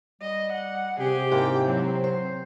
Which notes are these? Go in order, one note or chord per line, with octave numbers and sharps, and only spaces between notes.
G3 D#5
F#5
C3 G4 G#4
G#2 A#3 E4 G5
F#3 C4
C5